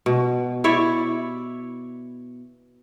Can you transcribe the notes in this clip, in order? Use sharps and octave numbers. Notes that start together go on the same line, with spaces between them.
B2
E4 C#5 D5 E5